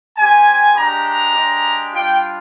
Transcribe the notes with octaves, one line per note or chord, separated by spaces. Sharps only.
C4 G4 G#5
G#3 D4 G4 A#5
G#3 D4 G4
G3 D4 F4 G5